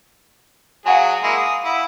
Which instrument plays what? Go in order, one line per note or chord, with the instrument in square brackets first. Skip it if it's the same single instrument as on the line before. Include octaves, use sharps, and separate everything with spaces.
[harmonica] F#3 G#4 [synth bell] F5 F#5 G#5
[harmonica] G#3 A#3 E4
D#6
E4